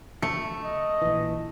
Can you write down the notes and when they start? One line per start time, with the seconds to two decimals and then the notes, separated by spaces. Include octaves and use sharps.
0.22 A3 C#7
0.64 D#5
1.02 A#1 E3